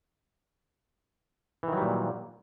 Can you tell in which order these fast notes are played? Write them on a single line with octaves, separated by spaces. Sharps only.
E3 D#3 F#3 G3 A#2